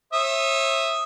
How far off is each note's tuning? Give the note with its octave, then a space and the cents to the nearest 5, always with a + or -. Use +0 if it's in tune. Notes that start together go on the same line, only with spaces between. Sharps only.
C#5 -40 E5 +0 D#6 +0